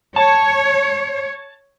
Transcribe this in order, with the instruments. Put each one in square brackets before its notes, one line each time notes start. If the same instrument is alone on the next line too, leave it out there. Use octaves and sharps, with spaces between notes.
[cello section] C#5 [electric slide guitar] A5